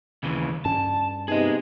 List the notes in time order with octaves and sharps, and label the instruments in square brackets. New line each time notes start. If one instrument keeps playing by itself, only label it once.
[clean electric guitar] D#2 C#3 E3
[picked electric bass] G2 C#4 [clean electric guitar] A5
[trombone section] C3 B3 D#4 [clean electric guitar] G#4 D#5